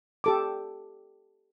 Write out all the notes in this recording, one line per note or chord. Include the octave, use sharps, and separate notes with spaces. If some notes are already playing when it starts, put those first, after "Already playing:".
G4 A4 D6